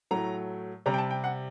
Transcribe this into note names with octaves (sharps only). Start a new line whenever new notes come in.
A2 F#3 A3 A#5
C3 G3 A#5
G5
A5
G5
F#5